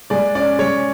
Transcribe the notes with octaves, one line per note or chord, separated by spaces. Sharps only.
G#3 D5
C#4 D5
G#3 C#5